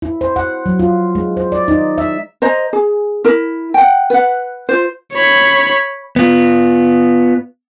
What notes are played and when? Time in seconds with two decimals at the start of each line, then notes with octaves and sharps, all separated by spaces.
0.02 E4
0.21 C5
0.36 F#5
0.66 F#3
0.79 F4
1.15 G#3
1.37 C5
1.52 D5
1.68 D#4
1.98 E5
2.42 C5 D#5 A#5
2.73 G#4
3.24 E4 A#4
3.74 F#5 G5
4.10 B4 F#5
4.69 F4 C5
5.13 C#5 B5
6.16 B3 F4